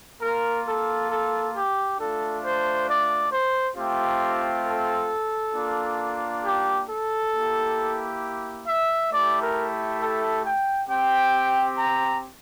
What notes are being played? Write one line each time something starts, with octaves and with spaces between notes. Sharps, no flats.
A#3 F4 A#4
A4
A4
G4
A3 D4 F4 A4
C5
D5
C5
A3 C4 F4 G4
A4
A#3 D4 F4
G4
A4
A#3 E4 G4
E5
A3 E4 G4 D5
A#4
A4
G5
C4 G4 G5
A#5